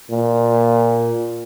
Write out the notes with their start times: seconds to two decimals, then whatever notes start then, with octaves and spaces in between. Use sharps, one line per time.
0.11 A#2